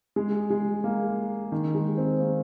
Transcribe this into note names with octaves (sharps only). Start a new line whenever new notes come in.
G#3
G#3
A#3
D#3
G#3
C4
A#3